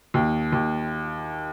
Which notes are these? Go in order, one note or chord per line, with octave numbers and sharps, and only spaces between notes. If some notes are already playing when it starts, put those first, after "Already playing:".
D#2
D#2